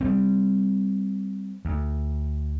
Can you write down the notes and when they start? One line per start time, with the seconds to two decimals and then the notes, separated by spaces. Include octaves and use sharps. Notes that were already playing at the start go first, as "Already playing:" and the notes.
0.01 G3 A3 C4
1.65 D2